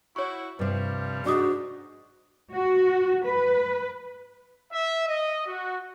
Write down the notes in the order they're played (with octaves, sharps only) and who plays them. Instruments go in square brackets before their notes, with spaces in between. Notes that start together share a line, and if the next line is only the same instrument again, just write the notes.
[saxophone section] E4 F#4 [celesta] C#5 C#6
[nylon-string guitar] G2 C3 [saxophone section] F3 G3
[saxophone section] G#2 [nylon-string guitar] D4 C5 [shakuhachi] F#4 [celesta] D5 D6 D#6
[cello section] F#4
B4
[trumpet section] E5
D#5
F#4